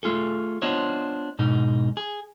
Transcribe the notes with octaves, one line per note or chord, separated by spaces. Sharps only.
A3 F4 G#4 A4
B3 D4 F4 C5 C#5 D#5
G#2 B2 D#4
G#4